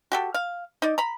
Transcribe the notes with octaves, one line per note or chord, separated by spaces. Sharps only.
F#4 G4 A4
F5
D#4 D5
A#5 B5